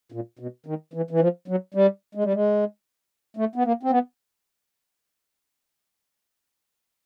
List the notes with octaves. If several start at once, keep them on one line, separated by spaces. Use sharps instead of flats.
A#2
B2
D#3
E3
E3
F3
F#3
G3
G#3
G3
G#3
A3
B3
A#3
C4
B3